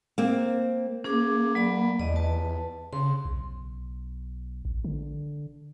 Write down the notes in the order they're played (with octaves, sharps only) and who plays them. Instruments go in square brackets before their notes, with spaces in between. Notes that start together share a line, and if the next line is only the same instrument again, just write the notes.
[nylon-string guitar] A#3 C4
[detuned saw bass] A#3 [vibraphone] C#4 G#4 D6
[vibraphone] F#3 D5 B5
[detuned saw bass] E2 [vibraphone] D5 D#5
[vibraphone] B4 A5
[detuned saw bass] C#3 [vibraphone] C6
[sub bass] B1
A1
D3